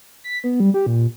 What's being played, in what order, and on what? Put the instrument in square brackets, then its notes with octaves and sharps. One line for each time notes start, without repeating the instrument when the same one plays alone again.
[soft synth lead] B6
B3
G3
G4
A#2